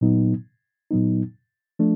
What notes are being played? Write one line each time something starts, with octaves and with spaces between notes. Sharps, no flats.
A#2 F#3 B3 D#4
A#2 F#3 B3 D#4
F3 A3 D4